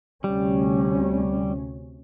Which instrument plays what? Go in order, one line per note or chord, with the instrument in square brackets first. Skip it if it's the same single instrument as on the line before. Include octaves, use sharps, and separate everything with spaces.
[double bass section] D2 C3 C#4 [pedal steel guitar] G3